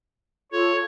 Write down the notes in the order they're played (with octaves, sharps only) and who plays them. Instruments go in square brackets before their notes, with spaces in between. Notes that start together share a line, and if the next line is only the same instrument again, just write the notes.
[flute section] F4 A4 [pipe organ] C#5